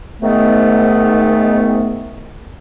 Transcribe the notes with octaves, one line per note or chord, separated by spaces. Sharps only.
G#2 D#3 A3 B3